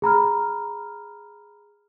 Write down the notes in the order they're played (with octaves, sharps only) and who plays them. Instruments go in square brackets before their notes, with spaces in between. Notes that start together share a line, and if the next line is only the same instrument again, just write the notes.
[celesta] G#4 A#5 B5 F6